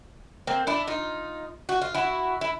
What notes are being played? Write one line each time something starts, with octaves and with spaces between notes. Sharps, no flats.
A#3 C4
D4 E4
D#4 F4
F#4
F4
E4 F#4
E4